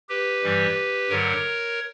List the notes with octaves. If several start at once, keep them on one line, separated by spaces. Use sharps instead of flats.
G4 B4
G2 E3 G3
G2 D3 F#3 A#4 C#5